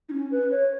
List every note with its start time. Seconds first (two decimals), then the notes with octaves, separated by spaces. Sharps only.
0.09 D#4
0.13 C#4
0.32 B4
0.51 C#5